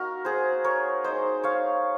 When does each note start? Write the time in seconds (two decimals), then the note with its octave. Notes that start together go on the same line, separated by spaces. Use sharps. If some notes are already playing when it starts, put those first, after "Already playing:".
Already playing: A#3 D#4 F#4 A#4
0.25 G#4 C5
0.64 A#4 C#5
1.04 G#3 D#4 C5 D#5
1.43 C#5 F5